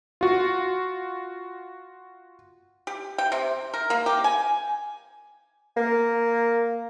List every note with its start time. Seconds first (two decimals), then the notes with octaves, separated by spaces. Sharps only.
0.21 F4 F#4
2.87 G4
3.18 G5
3.32 C3
3.74 A#4
3.90 A#3
4.06 G4
4.24 G#5
5.77 A#3